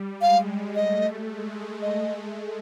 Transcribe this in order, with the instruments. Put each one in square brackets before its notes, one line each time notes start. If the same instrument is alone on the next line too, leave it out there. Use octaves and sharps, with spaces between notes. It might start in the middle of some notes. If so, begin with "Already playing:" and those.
Already playing: [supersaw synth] G3
[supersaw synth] G#3 [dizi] F5
[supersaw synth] A3 [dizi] D#5
[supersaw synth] G#3
[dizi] D#5